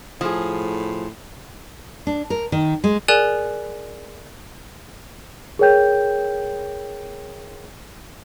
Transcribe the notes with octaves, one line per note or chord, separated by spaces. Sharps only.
A2 F3 G#4
D4
A#4
D#3
G#3
G#4 A#4 D5 G#5 F#6 E7
G#4 A#4 C#5 G5 G6